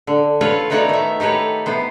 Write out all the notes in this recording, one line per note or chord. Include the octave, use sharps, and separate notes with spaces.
D3
F4 A4 B4 C#5 F5
A3 B3 D#4 F#4 C#5 D5
D#3 E5
D#4 G4 A4 B4 C#5
C3 B3 C5